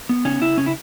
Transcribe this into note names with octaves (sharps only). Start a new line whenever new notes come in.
B3
C#3 C#4
C#3 E4
C#3 C#4
E4